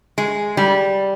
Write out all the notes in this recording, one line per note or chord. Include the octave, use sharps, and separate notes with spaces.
G#3
G3